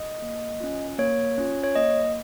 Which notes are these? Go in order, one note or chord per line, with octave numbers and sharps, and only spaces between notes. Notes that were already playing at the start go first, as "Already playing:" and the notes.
Already playing: D#5
A#3
C#4 F4
A#3 C#5
C#4 F4
C#5
A#3 D#5